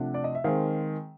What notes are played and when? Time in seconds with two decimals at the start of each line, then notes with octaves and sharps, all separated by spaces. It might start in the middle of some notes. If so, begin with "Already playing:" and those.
Already playing: C3 F3 A3 D4 F#5
0.14 D5
0.24 D#5
0.35 E5
0.44 D#3 G#3 C4 F5